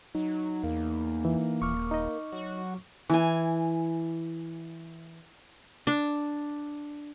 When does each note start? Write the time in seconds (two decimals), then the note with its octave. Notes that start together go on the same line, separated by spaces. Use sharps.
0.15 F#3 D#4
0.64 E2 A#3
1.25 E3
1.62 D#1 C#6 D6 F6
1.91 D#4 D#5
2.32 F#3 F#4
3.09 E3 G#5
5.87 D4